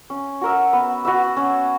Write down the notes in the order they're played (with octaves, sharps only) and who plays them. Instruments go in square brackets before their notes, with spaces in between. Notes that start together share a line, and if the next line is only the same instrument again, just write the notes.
[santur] C#4
F#4 A#4 E5
B3
F#4 B4 E5
C#4